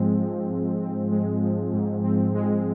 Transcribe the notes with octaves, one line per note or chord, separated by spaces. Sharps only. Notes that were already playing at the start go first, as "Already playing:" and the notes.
Already playing: G#2 F3 G#3 C4
F3
G#2
C4
G#3
F3
G#2
C4
G#3